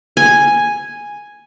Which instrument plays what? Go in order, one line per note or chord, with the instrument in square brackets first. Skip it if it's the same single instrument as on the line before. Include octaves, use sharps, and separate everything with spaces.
[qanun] G#5